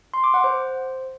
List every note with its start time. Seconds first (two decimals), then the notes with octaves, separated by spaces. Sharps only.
0.14 C6
0.24 D6
0.34 F#5
0.44 C5